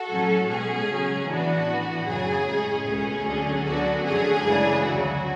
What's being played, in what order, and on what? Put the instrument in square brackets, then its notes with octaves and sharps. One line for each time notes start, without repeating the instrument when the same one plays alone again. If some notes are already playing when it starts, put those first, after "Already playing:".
Already playing: [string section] F#4 A4
A2 F#3 C#4
B2 G#3 C#4 G#4
C#3 F#3 C#4
A2 E3 B3 D4 F#4
A2 E3 B3
F#2 C#3 F#3 G#4
A2 G#3 C#4
C#2 B2 A3 C#4 G#4
D2 D3 F#3 C#4
D2 D3 F#3 B3 D4 F#4
F#2 D3 F#3 A3 C#4 G#4
C#3 E3 G#3 D4
D2 C#3 F#3 F#4